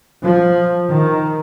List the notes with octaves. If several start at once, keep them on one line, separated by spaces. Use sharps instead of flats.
F3
D#3